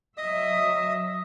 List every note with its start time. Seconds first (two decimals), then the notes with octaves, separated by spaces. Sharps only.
0.18 F#3 D#5 E5 D#6